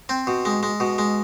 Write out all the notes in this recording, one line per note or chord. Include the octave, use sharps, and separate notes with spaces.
C4
B2
G#3
G#3
B2
G#3